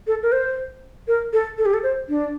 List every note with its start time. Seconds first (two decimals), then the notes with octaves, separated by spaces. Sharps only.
0.07 A4
0.23 A#4
0.32 C5
1.08 A#4
1.33 A4
1.58 A4
1.65 G4
1.73 A4
1.83 C5
2.09 D4